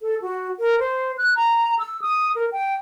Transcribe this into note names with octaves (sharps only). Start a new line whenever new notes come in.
A4
F#4
A#4
C5
F#6
A#5
E6
D#6
A#4
G5